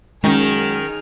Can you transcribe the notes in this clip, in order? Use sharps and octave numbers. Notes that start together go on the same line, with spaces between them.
F#2 D#3 G#3 C#4 G#4 F6